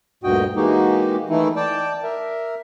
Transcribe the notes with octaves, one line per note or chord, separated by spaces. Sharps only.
D2 G2 A#2 F#4 D#5 G5
E3 G#3 A#3 D#4 F#4 G4
D#3 E3 A3 D#4 E4
D5 G5 A5
A#4 E5